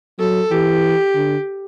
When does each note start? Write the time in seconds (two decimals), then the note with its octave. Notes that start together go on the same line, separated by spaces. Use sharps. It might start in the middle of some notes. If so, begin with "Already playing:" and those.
0.19 F#3 A4
0.51 E3 G4
1.14 D3